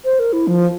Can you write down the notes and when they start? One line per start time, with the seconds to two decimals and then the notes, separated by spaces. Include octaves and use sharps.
0.05 C5
0.19 A#4
0.33 E4
0.47 F3